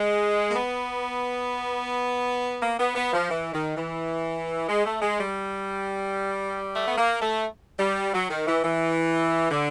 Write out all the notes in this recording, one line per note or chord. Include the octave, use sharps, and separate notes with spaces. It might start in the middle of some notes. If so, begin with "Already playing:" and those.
Already playing: G#3
A#3
B3
A#3
B3
B3
F3
E3
D#3
E3
G#3
A3
G#3
G3
A3
B3
A#3
A3
G3
F#3
D#3
E3
E3
D3